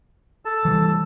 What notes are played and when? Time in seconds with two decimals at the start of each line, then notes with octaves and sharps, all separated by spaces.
0.45 A4 A5
0.65 E3 G3